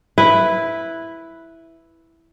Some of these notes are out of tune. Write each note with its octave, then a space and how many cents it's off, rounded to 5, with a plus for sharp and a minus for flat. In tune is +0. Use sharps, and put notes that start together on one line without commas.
E4 +0 B4 +0